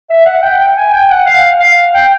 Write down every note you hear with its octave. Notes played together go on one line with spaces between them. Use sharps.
E5
F#5
G5
G5
G#5
G5
F#5
F5
F5
G5